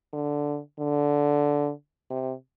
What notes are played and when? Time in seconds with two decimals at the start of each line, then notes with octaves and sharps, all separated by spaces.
0.13 D3
0.79 D3
2.10 C3